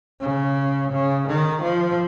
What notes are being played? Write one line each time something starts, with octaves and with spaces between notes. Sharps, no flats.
C#3
C#3
D#3
F3